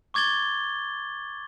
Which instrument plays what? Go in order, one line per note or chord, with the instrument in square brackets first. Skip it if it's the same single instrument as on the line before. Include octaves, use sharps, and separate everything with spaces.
[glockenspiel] C#6 D6 G#6 A6 G7